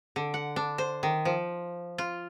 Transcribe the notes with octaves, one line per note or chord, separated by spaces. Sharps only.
D3
F#5
D4
C5
D#3
F3
F4